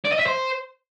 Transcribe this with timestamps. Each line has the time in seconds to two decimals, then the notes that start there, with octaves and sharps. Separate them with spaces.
0.05 D5
0.12 D#5
0.19 E5
0.26 C5